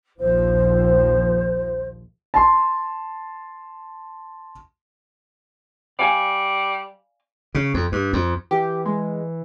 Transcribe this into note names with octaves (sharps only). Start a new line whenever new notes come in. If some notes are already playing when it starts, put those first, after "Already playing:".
A#1 D#2 F3 C5
A5 C6
G3 D5 F5 G#5
C#3
F2
G2
F2
E3 G4
G#3